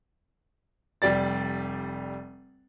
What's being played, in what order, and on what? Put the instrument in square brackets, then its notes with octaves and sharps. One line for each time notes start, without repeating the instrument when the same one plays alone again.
[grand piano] F1 G3 D5 A6